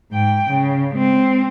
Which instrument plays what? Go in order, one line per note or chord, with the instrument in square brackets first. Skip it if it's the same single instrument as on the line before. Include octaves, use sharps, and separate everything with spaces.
[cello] G#2 G5
C#3
G#3 C4